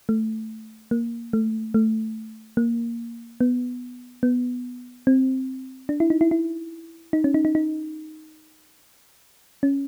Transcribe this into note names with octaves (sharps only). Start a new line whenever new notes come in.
A3
A#3
A3
A3
A#3
B3
B3
C4
D4
E4
D#4
E4
E4
D#4
C#4
D#4
D#4
D#4
C#4